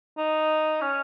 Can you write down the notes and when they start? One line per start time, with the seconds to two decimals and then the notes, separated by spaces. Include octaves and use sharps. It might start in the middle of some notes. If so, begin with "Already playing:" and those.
0.17 D#4
0.81 C#4